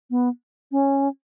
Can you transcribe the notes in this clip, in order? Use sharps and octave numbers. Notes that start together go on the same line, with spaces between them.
B3
C#4